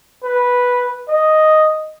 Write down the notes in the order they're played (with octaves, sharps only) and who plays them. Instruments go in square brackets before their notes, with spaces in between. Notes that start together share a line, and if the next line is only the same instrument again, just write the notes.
[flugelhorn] B4
D#5